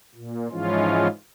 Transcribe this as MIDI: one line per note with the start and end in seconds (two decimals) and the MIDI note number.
0.15 0.48 46
0.51 1.07 44
0.51 1.07 52
0.51 1.07 53
0.51 1.07 56
0.51 1.07 61
0.51 1.07 65